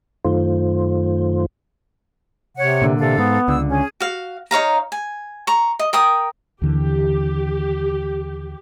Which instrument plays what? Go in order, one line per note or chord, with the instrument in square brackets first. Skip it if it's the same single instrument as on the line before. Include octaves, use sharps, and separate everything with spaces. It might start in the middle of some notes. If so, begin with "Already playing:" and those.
[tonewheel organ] F#2 D#3 A3 F4 C5
[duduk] C3 [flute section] C#5 F#5
[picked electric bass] A#2 D3
[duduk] C3 [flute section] A4 F5
[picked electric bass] G#2 [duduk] B3
[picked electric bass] C#2 D3 [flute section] E6
[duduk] C#4 [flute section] G#4
[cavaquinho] F#4 F5
D#4 C#5 F5 A#5
G#5
A#5 C#6
D#5
A#4 G5 D#6
[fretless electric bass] D#2 D3 E3 [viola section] G4